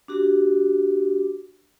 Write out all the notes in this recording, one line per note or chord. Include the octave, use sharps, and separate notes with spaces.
D4 F#4 G4